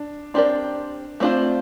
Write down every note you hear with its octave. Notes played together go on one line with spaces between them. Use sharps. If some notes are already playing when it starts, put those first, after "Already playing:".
Already playing: D4
C4 D4 G4 A#4 D5
A3 C4 D4 F4 C5